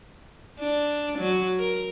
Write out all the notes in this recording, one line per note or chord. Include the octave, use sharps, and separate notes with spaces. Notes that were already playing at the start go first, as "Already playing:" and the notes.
D4
F#3
A#4